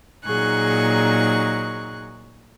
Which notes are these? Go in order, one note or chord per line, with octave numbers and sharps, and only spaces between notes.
A#2 F#3 D#4 G#4 C#6 F#6